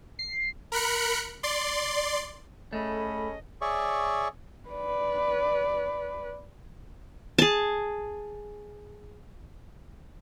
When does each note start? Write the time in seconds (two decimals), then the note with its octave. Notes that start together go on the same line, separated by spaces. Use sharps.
0.19 C7
0.72 A#4 B5 F#6 C#7
1.43 D5 C6
2.73 A3 C#4 G#4 A4 D#5 B5
3.61 G#4 C#5 D5 E5 C#6
4.69 B4 D5
7.38 G#4 A5